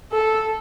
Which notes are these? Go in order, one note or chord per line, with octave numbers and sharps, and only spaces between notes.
A4